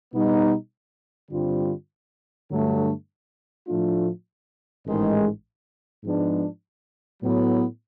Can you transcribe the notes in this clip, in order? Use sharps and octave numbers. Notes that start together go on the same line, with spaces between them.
B2 G3 B3 D#4
G2 D3 G3 C4 F4
G2 D3 F#3 A3
A2 F3 A3 D4 F4
A1 G#2 D#3 G#3
G#2 F3 G#3 B3 D4
A2 F#3 B3